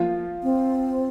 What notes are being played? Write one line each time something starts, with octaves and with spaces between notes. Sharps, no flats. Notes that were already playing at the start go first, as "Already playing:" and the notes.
Already playing: F3 A#3 F4
C4